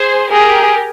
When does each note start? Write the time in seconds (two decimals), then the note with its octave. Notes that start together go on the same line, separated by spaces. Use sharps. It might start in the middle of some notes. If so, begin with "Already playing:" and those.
Already playing: G#4 C5
0.32 G4 G#4 A#4